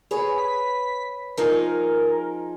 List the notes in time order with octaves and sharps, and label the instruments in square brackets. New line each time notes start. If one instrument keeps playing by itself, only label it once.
[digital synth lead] G#4 [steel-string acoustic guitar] B4 C#5
[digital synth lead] B6
[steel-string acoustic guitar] F3 D#4 G#4 [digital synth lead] A#4